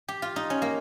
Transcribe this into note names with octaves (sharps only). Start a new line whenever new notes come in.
G4
F4
D#4
C#4
A#3